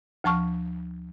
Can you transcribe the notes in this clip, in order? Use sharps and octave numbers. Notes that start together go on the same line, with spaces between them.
D2 F3 A5 C#6 F6